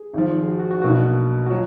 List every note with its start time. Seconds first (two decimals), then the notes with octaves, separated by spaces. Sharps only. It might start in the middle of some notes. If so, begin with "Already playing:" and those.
Already playing: G#4
0.13 G#1 G#2 F3
0.43 G#4
0.48 F#4
0.60 F#4
0.71 F#4
0.82 B1 B2 A#3 D4 F#4
1.46 F#4
1.50 F#3 F4